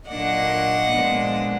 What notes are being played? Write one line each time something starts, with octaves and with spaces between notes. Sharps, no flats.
A#2 F#3 A#3 D4 D#5 F#5
A#2 F3 G#3 B3 D4